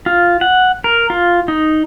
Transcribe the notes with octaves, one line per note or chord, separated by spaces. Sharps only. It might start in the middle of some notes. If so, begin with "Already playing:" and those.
F4
F#5
A#4
F4
D#4